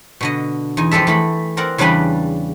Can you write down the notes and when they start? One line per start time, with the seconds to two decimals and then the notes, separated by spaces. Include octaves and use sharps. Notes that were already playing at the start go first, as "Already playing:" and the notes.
0.21 B2 D3 D#5
0.77 E2 D#4 G#5
0.91 F2 G#3 G4 A4 E5
1.07 E3 A3 B5
1.57 C4 A#4 D5 F#5
1.78 E2 C#3 G3 D4 B4 G#5